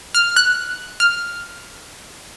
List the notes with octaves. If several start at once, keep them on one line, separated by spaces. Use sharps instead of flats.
F6
F#6
F6